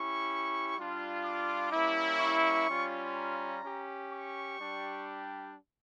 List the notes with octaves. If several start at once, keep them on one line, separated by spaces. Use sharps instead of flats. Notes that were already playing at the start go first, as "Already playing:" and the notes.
Already playing: C#4 E4 G4 C#6
G3 D4 F4
D6
G3 A#3 C#4 E4
C#6
G3 C#4 F4
A#5
C#4 G4
C#6
G3 D4 G4